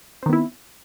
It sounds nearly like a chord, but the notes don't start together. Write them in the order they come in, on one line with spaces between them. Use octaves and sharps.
C4 D#3 B3 E4